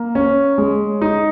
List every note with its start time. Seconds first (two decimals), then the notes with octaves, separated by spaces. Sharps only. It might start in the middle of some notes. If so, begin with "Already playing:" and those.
Already playing: A#3
0.15 C#4
0.58 G#3
1.02 D#4